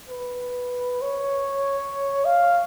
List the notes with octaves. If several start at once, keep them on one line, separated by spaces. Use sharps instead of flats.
B4
C#5
F5